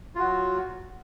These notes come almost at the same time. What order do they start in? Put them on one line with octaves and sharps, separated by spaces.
F4 F#4 F#3